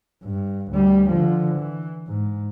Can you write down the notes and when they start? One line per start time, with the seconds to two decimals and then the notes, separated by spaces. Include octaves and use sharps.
0.24 G2
0.72 D2 G3
1.10 D3 F3
1.55 E3
2.08 G#2